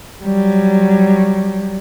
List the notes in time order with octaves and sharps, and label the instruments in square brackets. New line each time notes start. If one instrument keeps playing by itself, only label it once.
[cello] F#3 G3